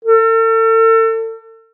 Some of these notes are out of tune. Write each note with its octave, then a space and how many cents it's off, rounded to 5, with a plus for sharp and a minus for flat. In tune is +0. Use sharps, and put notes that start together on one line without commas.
A4 +40